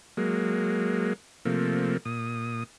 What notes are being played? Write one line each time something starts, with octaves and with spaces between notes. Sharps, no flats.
F#3 G#3 A#3
C3 F3 A3 A#3
A#2 D#6